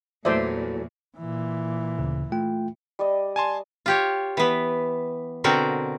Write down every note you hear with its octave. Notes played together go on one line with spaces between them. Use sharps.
E2 A#2 E3 F#3 A3 C5 D5 E5
A#2 E3
D2 C#3
A3 F4 G5
G3 D5 D#5
G#5 A5 C6
F4 G4 C#5
E3 B3
B2 D3 C4 F#4 A#4